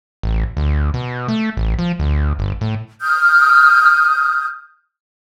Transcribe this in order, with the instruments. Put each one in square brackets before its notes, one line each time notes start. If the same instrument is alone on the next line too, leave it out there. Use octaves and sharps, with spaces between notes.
[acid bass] A1
D2
B2
A3
A1
F3
D2
G1
A2
[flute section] D#6 F6 G6